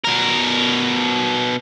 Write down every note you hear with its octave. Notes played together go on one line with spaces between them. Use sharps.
B2 A#4